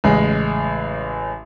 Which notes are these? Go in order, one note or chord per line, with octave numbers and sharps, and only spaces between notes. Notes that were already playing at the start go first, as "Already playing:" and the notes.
A1 C#3 G#3